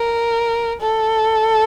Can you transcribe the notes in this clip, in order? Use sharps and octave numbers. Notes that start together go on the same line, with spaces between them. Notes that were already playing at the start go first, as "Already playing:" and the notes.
Already playing: A#4
A4